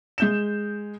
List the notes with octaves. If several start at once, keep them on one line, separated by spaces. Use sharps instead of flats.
G#3 G6 E7